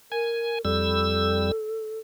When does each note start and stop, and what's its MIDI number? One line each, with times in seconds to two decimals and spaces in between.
0.12 0.64 70
0.12 0.58 80
0.65 1.51 41
0.65 1.51 55
0.65 1.99 69
0.65 1.51 88